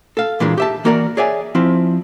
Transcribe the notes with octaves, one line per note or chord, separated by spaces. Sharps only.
A4 F5
A#2 E3 G#3 A#3 D4
G4 E5 A5
E3 A#3 F#4 A#4 C#5 D5
G#4 C#5 D5 E5 F#5 G#5
F3 C4 E4 F5